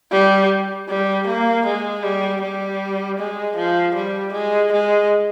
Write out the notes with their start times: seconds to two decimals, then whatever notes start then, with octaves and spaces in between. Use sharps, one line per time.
0.12 G3
0.89 G3
1.27 A#3
1.66 G#3
2.03 G3
2.41 G3
3.18 G#3
3.56 F3
3.95 G3
4.33 G#3
4.72 G#3